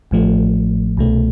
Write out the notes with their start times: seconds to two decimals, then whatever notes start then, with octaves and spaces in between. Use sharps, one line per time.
0.11 A1 A2 F3 A3
0.97 C2 B2 A3